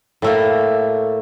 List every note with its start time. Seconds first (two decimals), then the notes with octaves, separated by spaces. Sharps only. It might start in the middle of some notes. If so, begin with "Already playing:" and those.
0.22 A2 A3 A#3